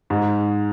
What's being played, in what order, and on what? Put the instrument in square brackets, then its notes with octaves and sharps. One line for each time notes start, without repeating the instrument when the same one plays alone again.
[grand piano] G#2